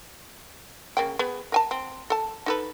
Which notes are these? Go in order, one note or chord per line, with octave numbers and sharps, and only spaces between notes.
C#3 A#3 G5
B3 G#4
A#4 G#5 A5
C4
A4 A5
D#4 A4 B4